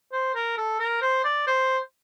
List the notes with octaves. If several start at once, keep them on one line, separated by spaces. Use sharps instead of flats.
C5
A#4
A4
A#4
C5
D5
C5